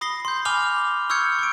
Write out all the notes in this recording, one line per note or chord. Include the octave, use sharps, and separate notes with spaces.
B5 D#6 A#6 C7 G7
C6 G6
G#5 B5 D6 F6 F7 G7
C#6 E6 F6 G6 G#6 C#7
C#6 D7